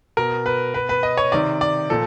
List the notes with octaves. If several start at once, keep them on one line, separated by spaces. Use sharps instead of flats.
B2 A#4
B4
B2 B4
B4
D#5
C#5
C3 D#3 D5
D5
A#2 F3 A4